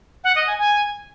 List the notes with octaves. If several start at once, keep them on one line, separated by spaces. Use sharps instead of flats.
F#5
D#5
G#5
G#5